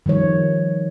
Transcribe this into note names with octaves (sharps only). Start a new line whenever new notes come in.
D#3 F3 G3 C#5